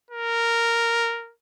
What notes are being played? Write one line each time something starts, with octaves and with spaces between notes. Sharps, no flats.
A#4